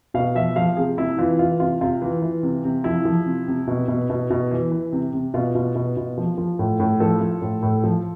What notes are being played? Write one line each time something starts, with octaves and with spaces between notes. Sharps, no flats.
B2 F5
F3 E5
F3 F5
C3 G#4
C3 E4
E3 F4
E3 F4
C3 F4
C3 F4
E3
E3
C3
C3
F3 E4
F3
C3
C3
B2
B2
B2
B2
E3
E3
C3
C3
B2 F4
B2
B2
B2
F3
F3
A2
A2
F3 A4
F3
A2
A2
F3